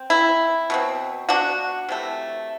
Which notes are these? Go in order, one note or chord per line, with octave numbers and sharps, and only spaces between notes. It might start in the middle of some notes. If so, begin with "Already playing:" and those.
Already playing: C4
E4
B2 F#3 C4
D4 F#4
C3 E3 A3